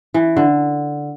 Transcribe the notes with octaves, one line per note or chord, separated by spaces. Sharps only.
E3
D3